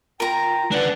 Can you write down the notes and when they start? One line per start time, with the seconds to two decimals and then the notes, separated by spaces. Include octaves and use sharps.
0.20 F4 A#4 G5 A#5
0.71 D4 B4 D5 F#5